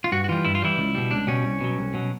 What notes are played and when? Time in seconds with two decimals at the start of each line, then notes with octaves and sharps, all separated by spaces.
0.04 F4
0.12 G2 F#4
0.24 F#4
0.29 E3 G3 F4
0.44 G2 E4
0.55 F4
0.62 E3 G3 E4
0.78 C#2
0.95 B2 G3
1.11 C#2 D4
1.27 B2 G3 C#4
1.44 C2
1.61 B2 F#3
1.77 C2
1.94 B2 F#3